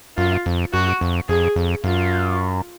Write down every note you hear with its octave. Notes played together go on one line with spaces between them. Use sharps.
F#2 F4
F2
F#2 F#4
F2
F2 G#4
F2
F#2 F4